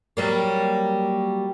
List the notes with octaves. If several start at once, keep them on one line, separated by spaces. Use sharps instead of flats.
F#3 G3 A#3